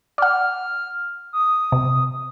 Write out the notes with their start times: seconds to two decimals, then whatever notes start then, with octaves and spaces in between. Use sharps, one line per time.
0.18 D5 F#5 F6
1.33 D#6
1.72 C3